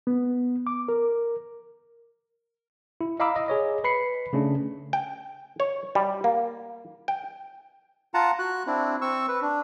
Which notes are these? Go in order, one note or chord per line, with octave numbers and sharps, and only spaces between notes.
B3
D6
A#4
E4
D#5 F5 A#5 B5 D6 E6
D#5
G#4 C#5 D#5
B4 B5 C7 C#7
C#3 A3 C#4 D4
G5
C#5
G3
A#3
G5
F4 F#5 A5 A#5
F#4 F#6
C4 D4 E4
C4 C#6 E6
B4
D4